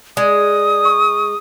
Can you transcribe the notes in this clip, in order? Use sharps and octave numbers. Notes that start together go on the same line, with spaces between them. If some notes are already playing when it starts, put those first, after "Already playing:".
G#3 D5 D#6
C#6